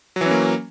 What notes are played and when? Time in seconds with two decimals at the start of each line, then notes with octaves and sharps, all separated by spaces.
0.16 F#3
0.21 E3
0.26 C#4
0.31 A#3